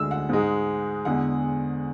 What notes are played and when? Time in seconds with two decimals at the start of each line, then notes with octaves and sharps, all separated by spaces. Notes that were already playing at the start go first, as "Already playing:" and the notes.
Already playing: D2 D3 G#3 E6
0.11 F#5
0.29 G#2 G#3
1.05 E2 D3 G#3 F#5